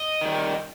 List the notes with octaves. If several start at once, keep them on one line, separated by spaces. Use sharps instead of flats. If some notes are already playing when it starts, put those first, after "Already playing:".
Already playing: D#5
D#3 G3